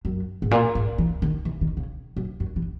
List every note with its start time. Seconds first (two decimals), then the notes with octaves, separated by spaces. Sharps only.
0.05 F#2
0.42 G#2
0.51 A#2
0.75 G#2
0.98 E3
1.22 D#3
1.45 E3
1.61 D#3
1.77 C#3
2.17 F#2
2.40 F#2
2.56 E3